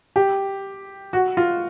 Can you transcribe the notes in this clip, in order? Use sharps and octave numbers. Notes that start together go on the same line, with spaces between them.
G4
F#4
F4